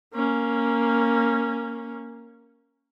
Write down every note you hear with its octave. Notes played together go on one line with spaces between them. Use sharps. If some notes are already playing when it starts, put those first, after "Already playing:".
A#3 C#4